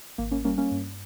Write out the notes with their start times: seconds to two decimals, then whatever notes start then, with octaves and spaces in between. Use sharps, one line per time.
0.18 G#1 A#3
0.31 A#3 C#4
0.45 G3 A#3 C#4
0.58 A#3 C#4
0.71 G2